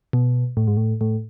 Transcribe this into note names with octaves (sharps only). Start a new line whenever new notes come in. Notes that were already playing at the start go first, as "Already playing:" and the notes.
B2
A2
G#2
A2
A2